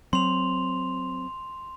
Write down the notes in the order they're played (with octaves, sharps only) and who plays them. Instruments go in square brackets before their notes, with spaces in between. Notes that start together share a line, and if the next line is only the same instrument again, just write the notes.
[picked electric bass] F#3 C4 [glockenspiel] C6 F7